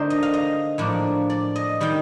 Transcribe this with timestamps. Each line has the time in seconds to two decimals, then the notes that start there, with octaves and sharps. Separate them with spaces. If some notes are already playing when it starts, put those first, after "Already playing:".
Already playing: D3 A3 D#4 A#4 C5
0.10 D#5
0.23 F5
0.34 D#5
0.78 A2 F3 A#3 D4
1.30 D5
1.56 D#5
1.81 D#3 G3 G5